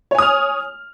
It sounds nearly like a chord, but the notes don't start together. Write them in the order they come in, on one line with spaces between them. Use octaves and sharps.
C#5 G#5 D#6 F6